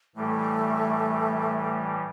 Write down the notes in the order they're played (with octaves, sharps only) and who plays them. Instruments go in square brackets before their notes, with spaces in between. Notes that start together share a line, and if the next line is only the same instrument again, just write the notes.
[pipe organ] A2 E3 G3 [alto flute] A3